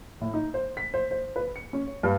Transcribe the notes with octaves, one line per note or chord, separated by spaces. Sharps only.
A2
D#4
C5
B6
C5
C5
B4
C#7
C#4
C#5
G2